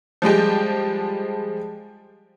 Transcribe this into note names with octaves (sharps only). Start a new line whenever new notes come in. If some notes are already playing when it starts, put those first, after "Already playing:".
F3 G3 G#3 G4